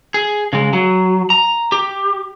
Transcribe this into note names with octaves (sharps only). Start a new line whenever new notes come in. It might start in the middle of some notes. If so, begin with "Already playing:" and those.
G#4
C#3 G#3
F#3
A#5
G4